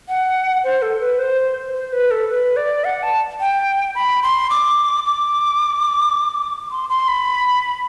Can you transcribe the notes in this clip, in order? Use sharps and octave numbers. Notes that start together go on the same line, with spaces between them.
F#5
C5
A4
B4
C5
C5
B4
A4
B4
D5
F#5
A5
G5
B5
C6
D6
D6
C6
C6
B5